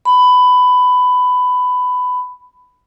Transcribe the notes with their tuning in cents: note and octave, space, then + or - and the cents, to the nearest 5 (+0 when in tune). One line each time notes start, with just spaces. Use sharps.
B5 +15